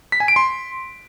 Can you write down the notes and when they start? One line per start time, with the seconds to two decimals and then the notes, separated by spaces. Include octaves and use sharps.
0.12 B6
0.20 G#5
0.28 D7
0.36 C6